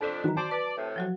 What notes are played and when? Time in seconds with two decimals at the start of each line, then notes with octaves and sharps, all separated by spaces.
0.01 F2 D4 A4 B6 E7
0.24 D#3 E3 F#3 F#4 A#5
0.37 C5 D5 A5
0.51 B4 D5
0.77 A2 C3
0.96 F3 F#3 F#4